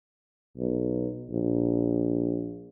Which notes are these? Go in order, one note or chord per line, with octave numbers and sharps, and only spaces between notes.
B1
A#1